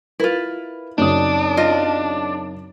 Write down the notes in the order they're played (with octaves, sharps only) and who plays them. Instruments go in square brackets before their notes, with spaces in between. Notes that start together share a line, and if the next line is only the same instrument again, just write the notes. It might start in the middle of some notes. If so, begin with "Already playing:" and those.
[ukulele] E4 F4 [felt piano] A#4 B4
[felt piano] F#2 C#3 D#6 [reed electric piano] C4 D#4 [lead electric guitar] D4
[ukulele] F4 D#5